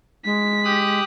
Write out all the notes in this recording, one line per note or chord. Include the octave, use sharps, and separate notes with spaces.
G#3 B6
G4 D#6 F#6